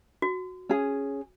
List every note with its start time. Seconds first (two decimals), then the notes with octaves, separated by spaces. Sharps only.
0.22 F#4
0.69 C#4 G#4